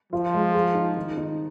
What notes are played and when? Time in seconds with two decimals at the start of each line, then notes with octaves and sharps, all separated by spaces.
0.13 F3 F4
0.34 G#3
0.54 G#4
0.75 D#4
0.97 D#3
1.17 D#4